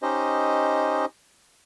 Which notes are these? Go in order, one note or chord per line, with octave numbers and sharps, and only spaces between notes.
C#4 D#4 G4 C5 D#5